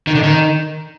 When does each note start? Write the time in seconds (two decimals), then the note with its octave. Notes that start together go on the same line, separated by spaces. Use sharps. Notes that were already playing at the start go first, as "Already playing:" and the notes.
0.07 D#3
0.15 D3
0.23 D#3